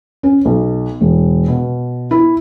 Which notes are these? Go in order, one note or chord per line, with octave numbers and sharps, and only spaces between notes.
C#4
B1
E1
B2
E4